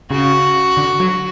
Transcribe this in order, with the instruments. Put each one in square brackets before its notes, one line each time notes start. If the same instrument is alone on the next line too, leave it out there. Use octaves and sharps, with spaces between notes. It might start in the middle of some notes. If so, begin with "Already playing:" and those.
[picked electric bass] C#3 [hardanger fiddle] F#4
[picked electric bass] D3
F#3